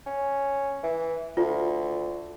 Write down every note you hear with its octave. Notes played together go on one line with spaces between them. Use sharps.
C#4
E3
D2 F4